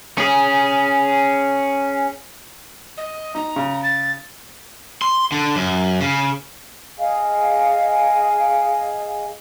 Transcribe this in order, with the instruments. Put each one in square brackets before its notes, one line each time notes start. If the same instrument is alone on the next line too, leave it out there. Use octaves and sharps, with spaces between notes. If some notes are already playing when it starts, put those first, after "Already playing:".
[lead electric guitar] C#4 G#4
[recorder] D#5
[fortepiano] D#4 [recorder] A#5
[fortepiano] C#3
[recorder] A6
[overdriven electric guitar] C6
D3
F#2
C#3
[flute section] G#4 D#5 F5 G#5